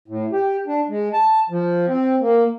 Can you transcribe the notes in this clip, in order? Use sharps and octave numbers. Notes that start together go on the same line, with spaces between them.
A2
G4
D4
G#3
A5
F3
C4
A#3